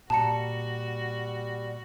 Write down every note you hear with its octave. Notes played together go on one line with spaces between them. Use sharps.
A#2 G3 F#4 A5 A#5 C#7